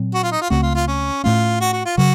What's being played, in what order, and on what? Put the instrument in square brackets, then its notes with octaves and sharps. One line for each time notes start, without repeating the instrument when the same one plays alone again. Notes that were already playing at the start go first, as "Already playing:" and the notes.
Already playing: [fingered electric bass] A#2 F#3 C4
[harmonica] F#4
F4
D#4
F4
[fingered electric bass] C#2 C#3 A3 C4 [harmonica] F#4
[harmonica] F4
F4
C#4
[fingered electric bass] A2 A3 C#4 [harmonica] F4
[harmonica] F#4
F#4
F4
[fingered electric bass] C#3 F#3 [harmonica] F#4